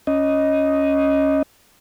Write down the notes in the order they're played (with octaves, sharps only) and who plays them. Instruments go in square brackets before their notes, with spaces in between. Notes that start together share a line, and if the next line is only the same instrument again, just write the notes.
[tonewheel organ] C#4 D#5